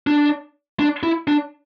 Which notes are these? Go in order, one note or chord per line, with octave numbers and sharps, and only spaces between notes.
D4
D4
E4
D4